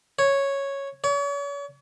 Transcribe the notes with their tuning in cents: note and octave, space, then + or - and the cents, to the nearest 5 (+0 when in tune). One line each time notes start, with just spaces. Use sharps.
C#5 -5
C#5 +40